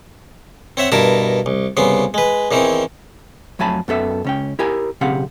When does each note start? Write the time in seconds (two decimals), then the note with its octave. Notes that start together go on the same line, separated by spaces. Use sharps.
0.77 C4 C#5 E5 F#5
0.92 G2 B2 E4 A#4 A5 A#5
1.46 C2
1.77 C2 C#3 B3 C6
2.14 G#3 B4
2.51 E2 D#3 E3 C4
3.59 F2 F#3 A3 G#5 A5 B5
3.88 F#2 B3 A4 E5
4.24 C#2 C#4 G5
4.59 E4 G4 A#4 G#5
5.01 B1 C#3 C4 G4 F5 F#5